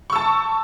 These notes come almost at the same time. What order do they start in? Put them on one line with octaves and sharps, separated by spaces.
C#6 E6 A5